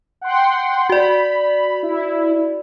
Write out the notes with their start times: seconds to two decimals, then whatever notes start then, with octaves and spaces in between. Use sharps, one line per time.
0.21 F#5 G5 C6
0.90 F#4 D5 B5
1.83 E4